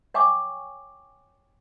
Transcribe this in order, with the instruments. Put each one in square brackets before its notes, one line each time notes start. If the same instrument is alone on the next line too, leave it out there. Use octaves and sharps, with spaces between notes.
[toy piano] C#5 G5 G#5 C#6 D6